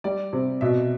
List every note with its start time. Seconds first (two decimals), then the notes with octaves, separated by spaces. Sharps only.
0.04 G3 D5
0.33 C3
0.61 B2 E5